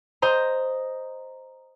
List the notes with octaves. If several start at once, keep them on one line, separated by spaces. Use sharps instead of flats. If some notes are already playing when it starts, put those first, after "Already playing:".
C5 D#5 A#5